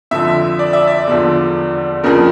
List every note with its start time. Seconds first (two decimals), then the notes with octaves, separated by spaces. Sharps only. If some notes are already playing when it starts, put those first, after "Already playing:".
0.11 F2 D3 F3 E5
0.59 D5
0.73 E5
0.87 D5
1.07 E2 D3 F3
2.04 F2 C#3 F3 A#4